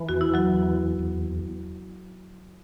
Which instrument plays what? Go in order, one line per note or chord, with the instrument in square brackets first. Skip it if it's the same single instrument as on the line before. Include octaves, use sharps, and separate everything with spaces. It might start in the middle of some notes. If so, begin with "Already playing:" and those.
Already playing: [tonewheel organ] E3
[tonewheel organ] E2 [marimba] F#4
[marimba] E4
F#3 F#4
[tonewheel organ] E2
E2